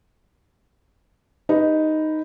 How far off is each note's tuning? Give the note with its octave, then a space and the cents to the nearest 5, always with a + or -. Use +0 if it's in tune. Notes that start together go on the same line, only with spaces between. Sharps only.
D#4 +0 G4 +30 B4 +0